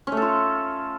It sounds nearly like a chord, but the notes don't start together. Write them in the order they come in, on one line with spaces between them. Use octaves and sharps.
C#4 A3 A4 F4